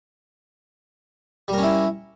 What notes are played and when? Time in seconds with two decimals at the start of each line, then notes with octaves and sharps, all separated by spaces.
1.48 G3
1.53 A#4
1.58 C#4
1.63 E4